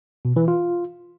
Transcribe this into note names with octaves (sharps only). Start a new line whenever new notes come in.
B2
E3
F4